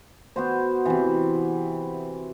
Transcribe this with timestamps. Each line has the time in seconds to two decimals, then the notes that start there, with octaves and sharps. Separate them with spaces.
0.36 B3 F#4 C5
0.85 C3 E3